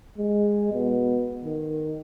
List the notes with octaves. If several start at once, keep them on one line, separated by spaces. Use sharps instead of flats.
G#3
B2
D#3